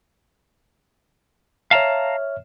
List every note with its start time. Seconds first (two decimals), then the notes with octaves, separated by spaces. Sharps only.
1.71 C#5 E5 F5 A5 A#5 F6